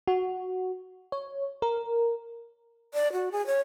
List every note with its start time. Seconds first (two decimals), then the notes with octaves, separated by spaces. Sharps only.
0.08 F#4
1.12 C#5
1.62 A#4
2.94 D5
3.13 F#4
3.32 G#4
3.47 C#5